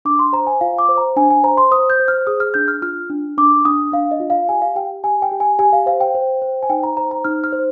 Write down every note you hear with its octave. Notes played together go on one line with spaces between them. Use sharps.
D4 D6
C6
C5 A#5
G#5
F4 F5
D6
C5
A#5
D4 G#5
G#5
C5 A#5
C6
C5 D#6
G6
C5
F6
G#4 D#6
F6
D4 G6
F6
F4 F6
D4
D4 D6
D4 D#6
D4 F5
D#5
F4
F5
G4 G#5
F5
G4 G5
G4 G#5
G5
G4
G#5
G4 G#5
F5
C5 F5
G5
C5
C5
G#5
D#4 G5
A#5
C5 A#5
A#5
D#4 F6
F6
C5